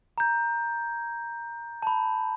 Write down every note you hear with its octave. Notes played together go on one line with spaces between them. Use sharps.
A#5 G6
A5 B5